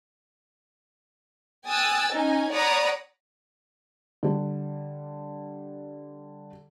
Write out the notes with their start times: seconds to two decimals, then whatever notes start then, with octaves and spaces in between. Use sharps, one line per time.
1.68 G5 G#5 D#6 E6 F#6 A6
2.12 C#4 D#4 G#5
2.52 C#5 D5 F#5 A#5 B5 D#6
4.23 D3 G3